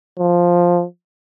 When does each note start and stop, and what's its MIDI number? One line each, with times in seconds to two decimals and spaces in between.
0.19 0.84 53